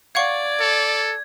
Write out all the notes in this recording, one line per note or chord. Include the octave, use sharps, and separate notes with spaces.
D5 F5 F#5 C#6 G#6
A4